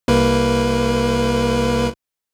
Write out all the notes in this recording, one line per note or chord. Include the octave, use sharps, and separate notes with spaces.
C2 A#3 B4